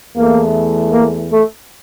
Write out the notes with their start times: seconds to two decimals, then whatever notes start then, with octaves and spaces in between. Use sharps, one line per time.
0.16 E2 E3 A3 A#3
0.92 A#3
1.31 A3